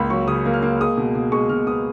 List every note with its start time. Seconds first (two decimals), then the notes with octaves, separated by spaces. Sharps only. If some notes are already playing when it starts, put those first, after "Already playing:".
Already playing: C#2 A#3 B5
0.10 F#3 C#6
0.27 C#3 D#6
0.46 A#3
0.54 F6
0.63 A#3
0.81 G#3 D#6
0.97 B2
1.15 B2
1.32 G#3 C#6
1.49 B2 F6
1.67 B3 D#6